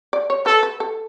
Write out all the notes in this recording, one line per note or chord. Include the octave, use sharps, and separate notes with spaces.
D5
C#5
A4 B4
B4
A4